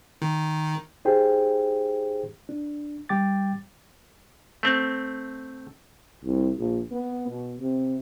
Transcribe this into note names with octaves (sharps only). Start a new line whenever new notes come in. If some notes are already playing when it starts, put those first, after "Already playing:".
D#3
D#4 G4 G#4 C5 G5
D4
G3 G5 D6 A6
A3 C4
C2
A#1
B3
B2
C3